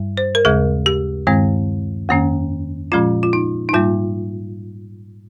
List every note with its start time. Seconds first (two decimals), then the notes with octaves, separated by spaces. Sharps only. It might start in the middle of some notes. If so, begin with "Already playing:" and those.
Already playing: G2 G3
0.17 C5
0.35 A#4
0.45 D#2 C#3 G#3 G#4
0.86 G4
1.27 G2 D#3 G#3 C4
2.09 F2 D#3 A#3 C#4
2.92 A#2 F3 G#3 C#4 F4
3.23 F4
3.33 D#4
3.69 D#4
3.73 G#2 G3 A#3 F4